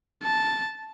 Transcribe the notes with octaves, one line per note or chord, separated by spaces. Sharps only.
A5